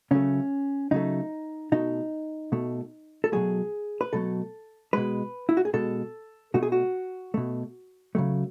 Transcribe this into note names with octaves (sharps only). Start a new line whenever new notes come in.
C#3 F#3 A3 C#4
C#3 F#3 A3 D#4
B2 A3 D#4
B2 A3
A4
B2 F#3 A3 G#4
B4
B2 F#3 A3 A4
B2 G#3 B4
E4
F#4
G#4
B2 G#3 A4
B2 A3 F#4
G#4
F#4
B2 A3
C#3 F#3 A3